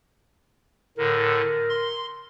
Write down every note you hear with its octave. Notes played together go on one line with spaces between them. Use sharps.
A2 D3 A#4
C6